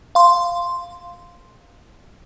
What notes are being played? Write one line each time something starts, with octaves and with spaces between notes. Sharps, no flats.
F5 C6